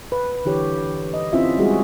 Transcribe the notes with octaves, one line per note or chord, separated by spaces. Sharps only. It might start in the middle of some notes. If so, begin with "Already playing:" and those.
B4
D3 E3 G4 C#5
D#5
C4 C#4 E4 F4 E5
G3 G#3 F#4 G#4